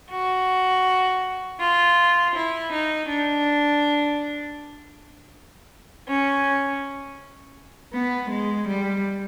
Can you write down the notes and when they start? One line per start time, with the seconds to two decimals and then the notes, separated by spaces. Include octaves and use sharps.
0.11 F#4
1.59 F4
2.35 E4
2.72 D#4
3.09 D4
6.07 C#4
7.94 B3
8.30 G#3
8.68 G3